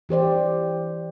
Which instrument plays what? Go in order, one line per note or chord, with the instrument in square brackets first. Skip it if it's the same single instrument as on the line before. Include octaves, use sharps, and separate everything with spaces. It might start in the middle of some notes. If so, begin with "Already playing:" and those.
[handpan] E3 G4 C5 D5